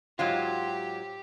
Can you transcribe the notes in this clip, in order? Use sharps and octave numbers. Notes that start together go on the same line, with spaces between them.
G#2 F#3 F4 G4